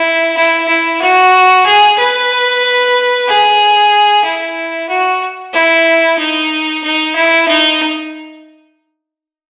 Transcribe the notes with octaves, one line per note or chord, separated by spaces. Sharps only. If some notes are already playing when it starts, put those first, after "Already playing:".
Already playing: E4
E4
E4
F#4
G#4
B4
G#4
E4
F#4
E4
D#4
D#4
E4
D#4